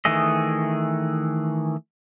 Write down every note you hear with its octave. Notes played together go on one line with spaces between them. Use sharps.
D#3 E3 A3 G#4 D#5